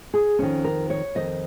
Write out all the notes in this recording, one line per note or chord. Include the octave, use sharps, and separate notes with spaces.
G#4
F2 D#3 C#4
A#4
C#5
F2 D#3 D#5